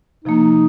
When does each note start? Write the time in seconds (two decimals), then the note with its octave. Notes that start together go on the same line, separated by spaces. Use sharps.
0.24 C3 F3 A#3 D#4